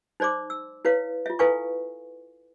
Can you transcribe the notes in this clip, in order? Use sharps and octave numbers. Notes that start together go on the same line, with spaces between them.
D#4 C5 D5 C6 D6
E6
E4 B4 C#5 F5
F4 E5
E4 A4 B4 F5 G#5 C#6